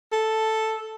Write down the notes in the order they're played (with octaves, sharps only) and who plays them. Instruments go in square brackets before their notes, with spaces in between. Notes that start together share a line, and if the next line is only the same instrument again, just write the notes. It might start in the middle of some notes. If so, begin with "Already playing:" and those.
[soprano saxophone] A4